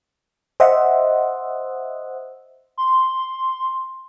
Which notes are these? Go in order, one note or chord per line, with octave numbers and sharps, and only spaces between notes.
C5 D#5 E5 F#5
C6